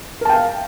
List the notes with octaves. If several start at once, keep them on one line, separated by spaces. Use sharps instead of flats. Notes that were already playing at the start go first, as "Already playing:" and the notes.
A#4 F5 G5 A5